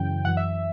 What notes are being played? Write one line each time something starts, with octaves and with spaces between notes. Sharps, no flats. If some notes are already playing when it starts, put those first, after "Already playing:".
Already playing: F#2 C#3 E3 G5
F#2 E3 F#5
E5